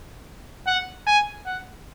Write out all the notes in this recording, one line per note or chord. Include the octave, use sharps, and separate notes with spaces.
F#5
G#5
F#5